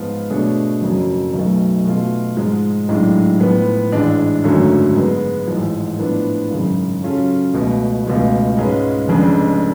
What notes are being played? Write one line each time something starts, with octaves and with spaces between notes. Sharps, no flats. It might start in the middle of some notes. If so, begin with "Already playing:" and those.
Already playing: G#2 F3 B3 F4
B2 A3 D4 G#4 C#5
F#1 F2 C#3 F#3
B1 B2 A3
B2 A3 F4
G#2 F3 G#3
B1 A2 G#3 D4
A2 F3 B3
A1 G#2 G#3 D4
G#1 F#2 D3 F#3 A3
G#2 G#3 B3
A1 G#2 F3
A2 F3 B3 D4
G#1 F#2 C#3
C#3 F#3 C#4 F4 A4
C#2 B2 A3
C#2 B2 A3 F4
G#2 G#3 C#4 F4 B4
F1 F2 C#3 G#3 D4